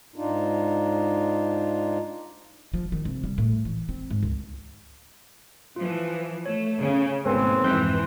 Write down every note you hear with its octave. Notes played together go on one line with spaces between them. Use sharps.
G#2 D4 D#4 F4
F3
D#3
C3
G3
A2
E3
C4
G#2
C#2
E3 F3 F4
A3 C#5
C#3
D#2 G#2 B2 C4 A4 B4 G#5
F2 G#2 C3 E3 C6 F#6 G6